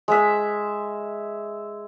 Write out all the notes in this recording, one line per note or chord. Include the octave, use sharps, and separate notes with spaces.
G#3 E5